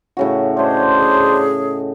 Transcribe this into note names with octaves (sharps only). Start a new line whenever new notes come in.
A2 C#3 F#4
A3 D4 C5 C#5 D#5
G#4